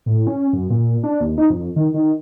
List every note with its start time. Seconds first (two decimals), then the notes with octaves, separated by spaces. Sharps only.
0.06 A2
0.27 C#4
0.53 F#2
0.70 A#2
1.04 D4
1.21 D#2
1.38 D#4
1.50 F2
1.76 D#3
1.94 D#3